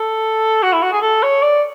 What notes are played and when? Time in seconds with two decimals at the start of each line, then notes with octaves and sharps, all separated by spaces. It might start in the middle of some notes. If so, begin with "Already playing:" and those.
Already playing: A4
0.63 F#4
0.73 E4
0.82 F#4
0.92 G#4
1.02 A4
1.23 C#5
1.42 D5